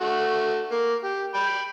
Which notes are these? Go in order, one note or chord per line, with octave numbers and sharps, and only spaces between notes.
A3 F#4
A#3
G4
G5 B5